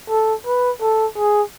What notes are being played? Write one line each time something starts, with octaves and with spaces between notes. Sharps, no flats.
A4
B4
A4
G#4